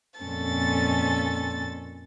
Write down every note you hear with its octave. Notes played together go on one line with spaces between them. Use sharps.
F2 A#2 C#4 A4 A6